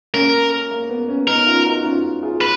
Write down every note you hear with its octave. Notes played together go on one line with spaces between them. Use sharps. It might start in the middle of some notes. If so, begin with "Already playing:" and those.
A#3 C#4 A#4
A#3
B3
A#3 C#4
B3 D#4 A#4
C#4 F4
D#4 F#4
C#4 F4
F4 G#4
B4